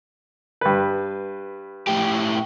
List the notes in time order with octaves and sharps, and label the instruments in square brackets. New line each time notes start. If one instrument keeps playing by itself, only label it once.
[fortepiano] G2 B4
[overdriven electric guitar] A2 G4